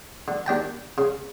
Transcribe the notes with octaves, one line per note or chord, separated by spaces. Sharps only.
D3
D#2 D4 G5 A5
C#3